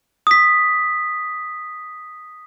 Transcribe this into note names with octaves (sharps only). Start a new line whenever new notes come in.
D#6 B6